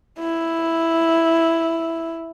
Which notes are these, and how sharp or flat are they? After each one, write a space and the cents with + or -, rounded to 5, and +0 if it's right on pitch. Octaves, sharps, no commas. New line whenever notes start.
E4 +0